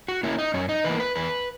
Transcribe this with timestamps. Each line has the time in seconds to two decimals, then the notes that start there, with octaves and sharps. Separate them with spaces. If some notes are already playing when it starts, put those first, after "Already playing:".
0.08 F#4
0.23 A#3 C#4 E4
0.39 D#4
0.54 F#2 C#4
0.69 D#4
0.84 E3 A#3 B4
1.00 B4
1.15 E2 B4